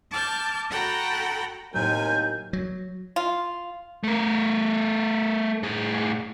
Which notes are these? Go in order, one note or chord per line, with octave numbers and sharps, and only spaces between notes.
A5 D6 F6 G6 G#6
F#4 A4 F#5 G5 A#5 B5
D#2 A2 C3 F#3 A#4 G#5 G6
F#3
F4
A3 A#4
A2 G#4